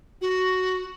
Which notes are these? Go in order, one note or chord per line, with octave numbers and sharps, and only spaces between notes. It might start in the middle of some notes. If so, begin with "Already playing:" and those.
F#4